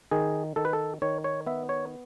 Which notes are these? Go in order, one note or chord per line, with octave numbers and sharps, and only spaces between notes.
D#3 G#4
D#3 A4
B4
A4
D#3 C#5
C#5
B3 E5
C#5